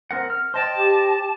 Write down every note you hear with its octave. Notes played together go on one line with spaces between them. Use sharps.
C4 A#4 F#5
F6
C5 D#5 G5 A5
G4